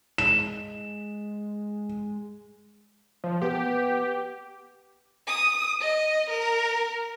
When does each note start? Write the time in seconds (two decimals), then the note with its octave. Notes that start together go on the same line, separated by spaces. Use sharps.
0.18 G#3 E7
3.24 F3
3.42 B3 G4
5.27 D#6
5.81 D#5
6.30 A#4